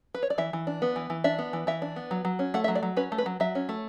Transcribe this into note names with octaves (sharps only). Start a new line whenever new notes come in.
B4
C#5
D5
E3 E5
E3
D4
B3
E3
E3
D4 E5
B3
E3
E3 E5
D4
B3
F#3
F#3
C#4
A3 F#5
E5
F#3
D5
F#3
C#4 B4
A3
B4
F#3
F#3 E5
C#4
A3